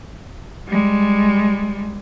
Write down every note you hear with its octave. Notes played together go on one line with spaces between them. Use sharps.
G3 G#3